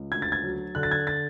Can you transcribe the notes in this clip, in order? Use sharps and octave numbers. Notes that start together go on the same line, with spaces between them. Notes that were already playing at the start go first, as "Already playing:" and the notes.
Already playing: C#2
D2 G#6
A6
G#6
F#3
D3 F#6
A6
G#6
A6